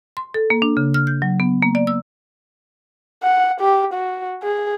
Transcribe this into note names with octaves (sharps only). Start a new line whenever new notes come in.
C6
A4
A#3
D4
C#3
F6
G6
F#3
B3
A#3
D5
E6
F#5
G4
F#4
G#4